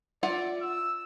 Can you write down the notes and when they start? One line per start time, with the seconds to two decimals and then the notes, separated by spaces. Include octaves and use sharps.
0.23 F4 D5 E5 F#5
0.62 E6